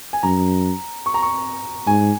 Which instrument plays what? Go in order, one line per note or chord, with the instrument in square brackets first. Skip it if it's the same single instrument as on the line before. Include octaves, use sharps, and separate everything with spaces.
[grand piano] G#5
[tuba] F#2 [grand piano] A#5
[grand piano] C#6
A#5
C#6
[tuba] G#2 [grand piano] G#5